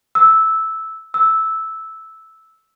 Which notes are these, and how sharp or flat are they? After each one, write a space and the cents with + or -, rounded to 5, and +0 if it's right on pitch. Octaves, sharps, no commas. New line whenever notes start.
E6 -10
E6 -10